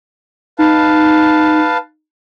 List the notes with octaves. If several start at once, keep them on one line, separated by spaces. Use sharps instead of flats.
D#4 B4 F5 A5